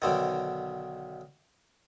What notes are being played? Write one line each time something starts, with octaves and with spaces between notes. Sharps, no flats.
B1 D3 D#3